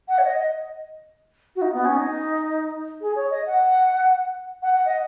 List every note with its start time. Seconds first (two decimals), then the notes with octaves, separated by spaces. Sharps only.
0.09 F#5
0.18 C#5
0.24 D#5
0.39 D#5
1.56 F#4
1.62 D#4
1.73 B3
1.85 C#4
1.97 D#4
3.01 G#4
3.15 C#5
3.31 D#5
3.46 F#5
4.63 F#5
4.73 F#5
4.85 D#5